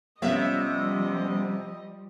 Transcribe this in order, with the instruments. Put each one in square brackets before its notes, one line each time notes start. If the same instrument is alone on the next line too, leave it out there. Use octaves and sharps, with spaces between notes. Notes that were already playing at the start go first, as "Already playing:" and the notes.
[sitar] C3 E5 [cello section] F3 G3 [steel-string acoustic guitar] B3 C#4 C#5 [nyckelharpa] D#5